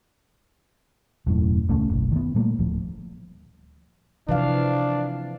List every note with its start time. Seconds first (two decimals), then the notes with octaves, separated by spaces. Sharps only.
1.26 E1 F#2 A2
1.69 D#1 C#2 A3 C#4
1.89 F#1 B1
2.12 D#3 B3
2.35 A#2 G3 A3 A#3
2.58 D1 F3
4.28 C3 E3 F3 D4 F5